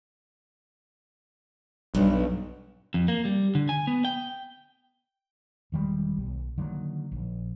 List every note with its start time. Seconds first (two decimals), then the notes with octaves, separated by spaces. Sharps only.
1.95 B1 G2
2.94 F2
3.08 A#3
3.25 G3
3.55 D3
3.69 G#5
3.87 B3
4.05 G5
5.72 E1 D#3 G3 G#3
6.17 B1
6.58 D3 D#3 F#3 A#3
7.12 A#1